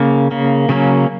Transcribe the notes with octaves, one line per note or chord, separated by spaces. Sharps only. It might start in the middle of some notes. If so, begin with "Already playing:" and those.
Already playing: C#3 A#3
C#3 A#3
C#3 F#3 A#3 C#4